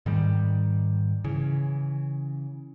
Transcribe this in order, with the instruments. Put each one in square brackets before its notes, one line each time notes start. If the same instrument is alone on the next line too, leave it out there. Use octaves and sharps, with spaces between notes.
[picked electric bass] G#2 D#3 G3
C#3 E3